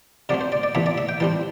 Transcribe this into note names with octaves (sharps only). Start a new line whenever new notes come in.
C3 F#3 A3 C4 D5
C5
D5
D5
C3 E3 A3 C4 E5
D5
E5
G5
E3 G3 C4 A5